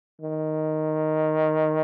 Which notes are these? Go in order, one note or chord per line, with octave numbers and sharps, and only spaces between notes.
D#3